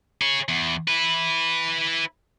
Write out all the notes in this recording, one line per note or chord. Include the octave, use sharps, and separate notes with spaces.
G#4 C#5
E2
E4 B4